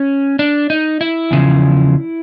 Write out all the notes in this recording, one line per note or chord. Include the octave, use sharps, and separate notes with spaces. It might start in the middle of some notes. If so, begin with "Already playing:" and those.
Already playing: C#4
D4
D#4
E4
E2 C#3 F3